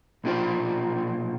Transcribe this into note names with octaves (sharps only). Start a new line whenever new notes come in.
B1 A#2 D4 F4 C5